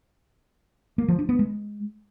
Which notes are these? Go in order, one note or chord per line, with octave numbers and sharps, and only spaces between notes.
A#3
F3
D4
B3
G#3